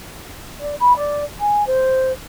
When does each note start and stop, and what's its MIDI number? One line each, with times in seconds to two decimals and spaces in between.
0.59 0.73 74
0.80 0.95 83
0.96 1.22 74
1.39 1.65 80
1.67 2.12 72